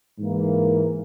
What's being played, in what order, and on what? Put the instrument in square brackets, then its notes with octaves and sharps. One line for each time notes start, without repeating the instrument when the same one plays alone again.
[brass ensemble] G#2 E3 A#3